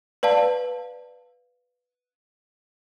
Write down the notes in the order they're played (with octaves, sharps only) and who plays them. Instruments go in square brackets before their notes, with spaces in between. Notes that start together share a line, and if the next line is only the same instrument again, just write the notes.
[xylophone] B4 D5 F5 A5